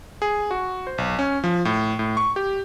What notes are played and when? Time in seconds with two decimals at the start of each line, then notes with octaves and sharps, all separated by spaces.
0.22 G#4
0.51 F#4
0.87 C5
0.98 B1
1.19 C#4
1.44 F3
1.65 A2
1.99 A2
2.17 C#6
2.36 G4